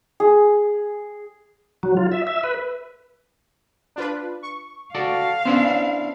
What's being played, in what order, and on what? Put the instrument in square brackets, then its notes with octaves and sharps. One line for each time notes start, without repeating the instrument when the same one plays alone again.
[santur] G#4
[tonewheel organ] F#3
F4
E5
E5
B4
[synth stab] D4 F4 B4
C#6
[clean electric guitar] F#4 A4 D5 [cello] F5
[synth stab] B3 C#4 [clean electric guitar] D4 E4 C5